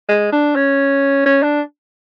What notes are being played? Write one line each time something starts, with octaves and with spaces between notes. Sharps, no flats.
G#3
D4
C#4
C#4
D4